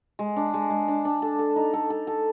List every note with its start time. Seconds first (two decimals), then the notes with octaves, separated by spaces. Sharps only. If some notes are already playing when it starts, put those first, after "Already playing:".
0.19 G#3
0.36 D4
0.54 G#3
0.70 G#3
0.88 D4
1.05 D4
1.22 A4
1.39 A4
1.56 D#4
1.73 A4
1.90 A4
2.07 A4